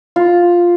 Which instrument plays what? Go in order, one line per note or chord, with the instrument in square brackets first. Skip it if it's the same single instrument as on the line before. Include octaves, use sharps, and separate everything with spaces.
[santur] F4